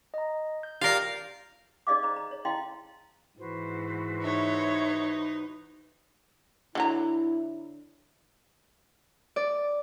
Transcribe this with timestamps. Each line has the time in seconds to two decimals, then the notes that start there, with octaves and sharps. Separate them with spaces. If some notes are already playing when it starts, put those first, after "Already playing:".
0.14 D#5 A#5
0.63 G6
0.81 F4 G4 A#4 D5 F5 C7
1.87 D#4 G#4 D5 D#5 F5 D6
2.03 C5 D#5 A#5
2.16 A#5
2.31 C#5
2.45 E4 D#5 F5 G5 A5 C6
3.38 G#2 E3 F#4 B4 C5
4.23 D#4 C#5 E5
6.75 D3 F#3 E4 A#5
9.36 D5